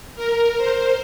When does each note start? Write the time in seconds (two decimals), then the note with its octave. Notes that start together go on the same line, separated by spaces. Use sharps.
0.16 A#4
0.57 C5